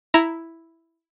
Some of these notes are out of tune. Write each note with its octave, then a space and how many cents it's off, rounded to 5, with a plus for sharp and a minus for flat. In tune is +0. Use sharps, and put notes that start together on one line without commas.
E4 +0 A#5 +0